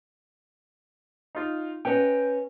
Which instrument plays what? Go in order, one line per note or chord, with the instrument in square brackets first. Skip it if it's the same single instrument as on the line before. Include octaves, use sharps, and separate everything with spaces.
[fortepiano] D#4 F4
[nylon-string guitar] C#4 B4 D#5 [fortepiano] G5